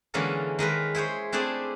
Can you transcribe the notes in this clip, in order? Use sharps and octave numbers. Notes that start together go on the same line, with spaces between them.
D3 E3 G#3 A#3 C#4 A4
D#3 G#3 A#4 B4
E4 G#4 C5 C#5
A3 C4 D4 E4 G#4 D5